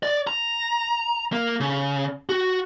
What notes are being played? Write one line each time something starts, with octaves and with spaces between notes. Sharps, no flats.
D5
A#5
A#3
C#3
F#4